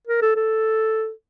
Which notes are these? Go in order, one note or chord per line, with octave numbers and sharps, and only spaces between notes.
A#4
A4
A4